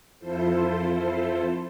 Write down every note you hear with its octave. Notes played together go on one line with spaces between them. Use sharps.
F2 E4 F4 A4 C5